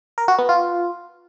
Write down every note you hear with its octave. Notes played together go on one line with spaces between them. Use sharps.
A#4
F#4
B3
F4